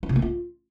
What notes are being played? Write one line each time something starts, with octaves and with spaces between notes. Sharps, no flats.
E4
C3
A#3
F4